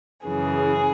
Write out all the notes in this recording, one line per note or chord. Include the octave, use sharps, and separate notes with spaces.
F#2 C#3 E3 G#4